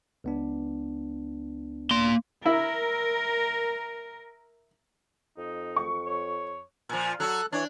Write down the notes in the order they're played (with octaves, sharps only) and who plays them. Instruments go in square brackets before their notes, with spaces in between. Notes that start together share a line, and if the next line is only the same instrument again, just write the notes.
[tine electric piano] C#2 B3 D4
[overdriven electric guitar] A#3 C6
[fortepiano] E4 [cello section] A#4
[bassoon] F2 [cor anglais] D#4
[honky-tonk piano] C#6
[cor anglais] C#5
[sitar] A#2 F3
[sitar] F#3 F#4 [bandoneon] A4 F#6
[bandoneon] E3 C#5 [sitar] D4